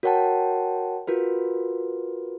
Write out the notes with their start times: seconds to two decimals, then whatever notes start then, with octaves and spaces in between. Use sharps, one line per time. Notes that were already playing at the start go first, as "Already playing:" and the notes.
0.03 F#4 A#4 C#5 F#5 G5 A5
1.07 F4 F#4 A#4 B4